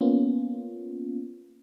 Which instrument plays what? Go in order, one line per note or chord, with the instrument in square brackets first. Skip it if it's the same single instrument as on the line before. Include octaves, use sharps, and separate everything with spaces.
[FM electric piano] A#3 B3 C#4 F4